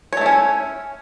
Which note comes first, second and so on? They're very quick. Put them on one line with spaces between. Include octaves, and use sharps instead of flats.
C#5 A3 E4 C#4